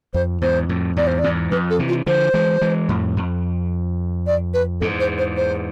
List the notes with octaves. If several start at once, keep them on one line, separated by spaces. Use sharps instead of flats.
F2 C5
E2 G#2 C5
F2 A2
E2 G#2 D5
C5
D5
E2 G#2
F2 B4
A4
C3 E3
F4
D3 F3 C5
E3 G#3
E3 G#3
F2 A2
F2
D5
B4
E2 G#2 A4
C5
C5
C5